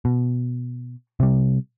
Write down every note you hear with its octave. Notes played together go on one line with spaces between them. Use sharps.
B2
C3 G3